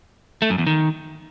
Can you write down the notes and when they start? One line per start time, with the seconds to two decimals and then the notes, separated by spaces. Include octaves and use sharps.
0.42 A3
0.50 F#2
0.58 E2
0.67 D#3